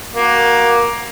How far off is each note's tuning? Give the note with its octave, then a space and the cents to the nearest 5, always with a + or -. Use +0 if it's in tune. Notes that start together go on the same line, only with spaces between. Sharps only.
A#3 +15 F#4 +0